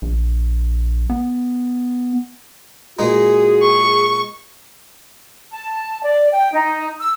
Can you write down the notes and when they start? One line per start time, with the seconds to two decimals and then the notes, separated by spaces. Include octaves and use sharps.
0.02 A#1
1.10 B3
2.99 A#2 G#3 D#4 F#4 G#4
3.62 C#6
5.52 A5
6.03 D5
6.32 G5
6.53 D#4
7.00 E6